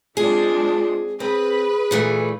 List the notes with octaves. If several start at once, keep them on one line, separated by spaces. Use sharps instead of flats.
G#3 C4 D4 F4 G#4
C4 G#4 B4
A#2 E3 A3